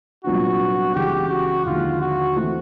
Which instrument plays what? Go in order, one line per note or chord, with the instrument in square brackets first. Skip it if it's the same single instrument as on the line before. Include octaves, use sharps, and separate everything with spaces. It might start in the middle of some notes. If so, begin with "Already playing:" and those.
[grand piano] C2 A#2 F#3 B3 D4 [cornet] F#4
[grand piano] C#2 C#3 E3 G#3 [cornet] G4
[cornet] F#4
[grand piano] D#2 D3 F3 G#3 [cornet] F4
[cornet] F#4
[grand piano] E3 A3 C4